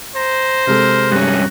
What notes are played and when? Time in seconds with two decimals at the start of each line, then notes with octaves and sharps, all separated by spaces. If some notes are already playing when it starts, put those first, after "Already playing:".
0.16 C5 A#5
0.67 C3 G#3 A4 A#4
1.12 G2 C#4 F#4